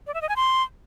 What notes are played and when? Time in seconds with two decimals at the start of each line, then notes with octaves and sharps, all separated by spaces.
0.07 D5
0.14 E5
0.22 D#5
0.29 G#5
0.36 C6